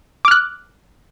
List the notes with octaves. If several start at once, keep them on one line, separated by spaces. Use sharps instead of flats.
D6 F6 F#6